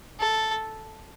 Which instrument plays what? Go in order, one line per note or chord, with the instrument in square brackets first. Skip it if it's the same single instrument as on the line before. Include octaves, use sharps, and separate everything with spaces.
[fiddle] A4